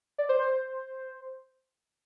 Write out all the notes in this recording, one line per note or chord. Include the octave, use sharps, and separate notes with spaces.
D5
C5
C5